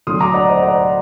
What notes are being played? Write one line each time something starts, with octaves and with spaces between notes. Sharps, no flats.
D2 D3 F#3 C6 D#6
A#5 D6
D5 F#5
C5 D#5
D5 F#5